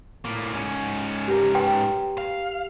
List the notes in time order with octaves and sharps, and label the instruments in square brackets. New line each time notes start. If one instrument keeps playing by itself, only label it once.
[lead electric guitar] A2 A#3
G#2 C#4
[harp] G4 A#4
[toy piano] B4 G5 C6
[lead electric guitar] F5